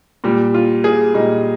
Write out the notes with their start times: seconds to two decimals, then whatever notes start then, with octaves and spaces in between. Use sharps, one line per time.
0.24 A#2 G3
0.54 F4
0.84 G#4
1.14 A#2 G3 D#4